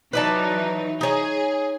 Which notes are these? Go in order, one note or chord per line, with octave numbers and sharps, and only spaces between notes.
E3 F#3 D#4 B4 D5 A5
D#4 G#4 C#5